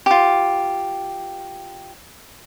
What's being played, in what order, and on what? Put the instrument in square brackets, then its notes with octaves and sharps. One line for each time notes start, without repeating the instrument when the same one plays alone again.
[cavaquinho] F4 G4